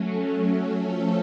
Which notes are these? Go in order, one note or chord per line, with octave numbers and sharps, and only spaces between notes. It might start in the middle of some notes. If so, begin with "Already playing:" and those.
Already playing: F#3 A3 C#4
F3 A3 C#4 A4